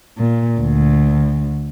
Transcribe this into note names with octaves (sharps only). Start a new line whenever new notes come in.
A#2
D2